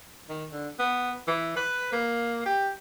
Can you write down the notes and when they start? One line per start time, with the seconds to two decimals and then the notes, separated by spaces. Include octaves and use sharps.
0.29 D#3
0.52 D3
0.79 B3
1.28 E3
1.56 B4
1.92 A#3
2.46 G4